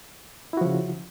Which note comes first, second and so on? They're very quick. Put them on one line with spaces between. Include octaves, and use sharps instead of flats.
E4 F#4 F3 C#3